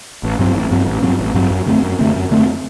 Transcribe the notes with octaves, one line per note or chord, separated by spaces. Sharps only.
A1
G2 F#3 C4
A1
G2 F#3 C4
A1
G2 F#3 C4
A1
G2 F#3 C4
F#2
D3 A3 C4
F#2
D3 A3 C4
F#2
D3 A3 C4